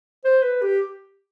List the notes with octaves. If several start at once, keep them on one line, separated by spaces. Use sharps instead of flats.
C5
B4
G4